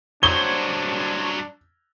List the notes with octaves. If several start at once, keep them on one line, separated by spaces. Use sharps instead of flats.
G2 F#3 D4 F#4 C5 C#5 G7